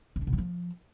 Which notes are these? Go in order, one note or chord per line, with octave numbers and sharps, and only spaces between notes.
C3
D3
B2
F#3
F3